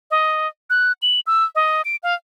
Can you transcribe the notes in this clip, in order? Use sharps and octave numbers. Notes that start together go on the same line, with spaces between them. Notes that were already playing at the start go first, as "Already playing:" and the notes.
D#5
F#6
F#7
E6
D#5
D7
F5